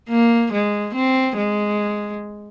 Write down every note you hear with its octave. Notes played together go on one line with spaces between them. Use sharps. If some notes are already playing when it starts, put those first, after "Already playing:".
A#3
G#3
C4
G#3